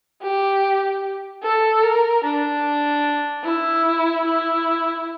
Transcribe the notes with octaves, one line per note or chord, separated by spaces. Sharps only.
G4
A4
A#4
D4
E4
E4